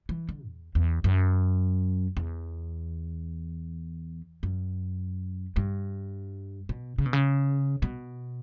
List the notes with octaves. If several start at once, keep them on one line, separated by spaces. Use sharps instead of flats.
E3
D3
E2
E2
F#2
E2
F#2
G2
B2
C#3
B2
C#3
B2